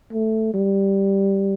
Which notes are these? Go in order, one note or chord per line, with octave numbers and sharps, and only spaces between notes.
A3
G3